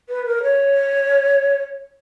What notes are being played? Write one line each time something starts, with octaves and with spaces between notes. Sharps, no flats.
B4
A#4
C#5